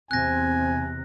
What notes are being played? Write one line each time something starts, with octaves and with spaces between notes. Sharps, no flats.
E2 C3 C4 G#5 F#6 A#6